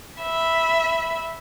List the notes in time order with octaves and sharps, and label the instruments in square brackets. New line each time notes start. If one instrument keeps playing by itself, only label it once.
[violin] E5 B5